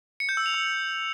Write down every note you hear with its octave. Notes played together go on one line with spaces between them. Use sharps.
C#7
G6
E6
F7
E6